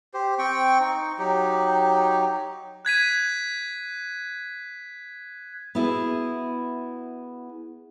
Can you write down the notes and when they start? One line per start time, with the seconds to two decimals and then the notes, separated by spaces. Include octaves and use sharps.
0.14 G4 C5
0.39 C4 G5 C#6
0.80 D#4
1.19 F#3 D#4 G4
2.85 F#6 G#6 B6 D#7
5.75 B3 E4 F#4 G#4